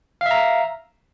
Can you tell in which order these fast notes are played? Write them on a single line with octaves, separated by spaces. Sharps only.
F5 E5 A#5